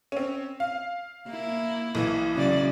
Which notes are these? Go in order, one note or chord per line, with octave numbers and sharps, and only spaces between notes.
C4 C#4
F5
A#3 E4
B1 E3
F#2 C#3 D5